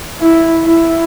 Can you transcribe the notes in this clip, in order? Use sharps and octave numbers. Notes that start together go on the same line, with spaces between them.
E4
E4